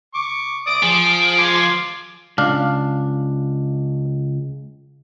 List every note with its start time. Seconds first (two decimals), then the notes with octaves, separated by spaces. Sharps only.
0.15 C#6 D6
0.67 D5 D6 D#6 D7
0.83 F3 G#4
1.39 G#5 C6 D6
2.38 C#2 D4 F5